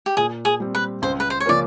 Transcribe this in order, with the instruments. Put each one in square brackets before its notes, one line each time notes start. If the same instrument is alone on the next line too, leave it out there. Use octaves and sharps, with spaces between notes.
[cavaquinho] G4
[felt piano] A#2 [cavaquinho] G#4
[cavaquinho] G#4
[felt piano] G3 C4
[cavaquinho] B4
[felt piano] C#2 [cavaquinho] C5
[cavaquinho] B4
C5
C#5
[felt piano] C#3 F3 A#3 C#4 [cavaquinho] D5